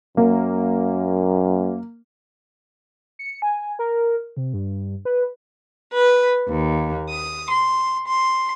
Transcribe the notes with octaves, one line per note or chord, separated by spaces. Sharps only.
F#2 A#3
C#7
G#5
A#4
C3
G2
B4
B4
D#2
D#6
C6
C6